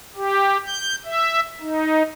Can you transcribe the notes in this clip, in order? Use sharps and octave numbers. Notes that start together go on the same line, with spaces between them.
G4
G6
E5
D#4